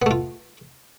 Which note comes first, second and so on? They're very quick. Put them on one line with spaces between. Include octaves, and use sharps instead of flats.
B3 A3 F4